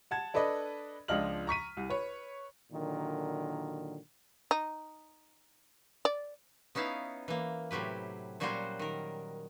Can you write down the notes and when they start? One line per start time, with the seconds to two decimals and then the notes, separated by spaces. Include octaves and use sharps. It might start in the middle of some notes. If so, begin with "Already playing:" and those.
0.11 F#5 A5 G#6
0.34 D4 A4 B4 D5 D#5
1.08 C#2 F3 D4 D#5 F6 F#7
1.47 A#5 C#6 B6 D#7
1.77 C2
1.90 B4 C#5
2.72 A#2 D3 D#3 F#3
4.51 D#4
6.05 D5
6.75 B3 C#4 D#4 E4 F5
7.28 E3 A#3
7.71 A2 C3 F#3 G4 B4
8.40 A#2 F#3 G3 C#4 F#4 C5
8.79 D#3 A#4